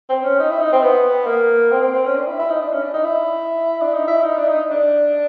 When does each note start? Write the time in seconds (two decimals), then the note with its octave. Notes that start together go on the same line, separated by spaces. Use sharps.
0.09 C4
0.24 C#4
0.39 D#4
0.50 E4
0.60 D#4
0.72 C4
0.83 B3
1.27 A#3
1.72 C4
1.82 C4
1.94 C4
2.05 C#4
2.16 D4
2.27 E4
2.39 E4
2.49 D#4
2.61 D4
2.72 C#4
2.83 D4
2.94 D#4
3.04 E4
3.81 D4
3.94 D#4
4.08 E4
4.23 D#4
4.37 D4
4.49 D#4
4.71 D4